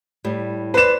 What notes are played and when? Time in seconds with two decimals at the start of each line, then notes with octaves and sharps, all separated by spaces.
0.24 A2 G3
0.74 B4 C5 D5 E7